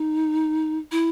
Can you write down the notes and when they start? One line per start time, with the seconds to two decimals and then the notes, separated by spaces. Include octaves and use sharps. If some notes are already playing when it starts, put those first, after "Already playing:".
Already playing: D#4
0.91 E4